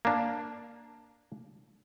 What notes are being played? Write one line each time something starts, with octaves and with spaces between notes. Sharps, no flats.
A#3 D4